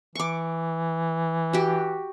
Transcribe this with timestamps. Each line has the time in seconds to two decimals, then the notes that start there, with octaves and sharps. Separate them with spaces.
0.15 E3 C#6 D6
1.53 F#4 G4